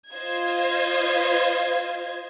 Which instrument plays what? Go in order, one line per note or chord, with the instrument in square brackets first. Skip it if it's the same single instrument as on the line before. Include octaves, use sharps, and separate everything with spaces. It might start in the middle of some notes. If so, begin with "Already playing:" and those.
[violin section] F4 C5 D#5 F5 G#6